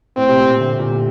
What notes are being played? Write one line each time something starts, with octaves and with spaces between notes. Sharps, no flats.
A2 C4
C3
A#2
D3
A#2